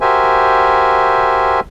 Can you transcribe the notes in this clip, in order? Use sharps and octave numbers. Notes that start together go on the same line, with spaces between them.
F#4 G4 A#4 C5 E5 G#5